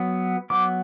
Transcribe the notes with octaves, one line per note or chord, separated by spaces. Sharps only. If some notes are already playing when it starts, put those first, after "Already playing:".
Already playing: F#3 B3
F#3 B3 D6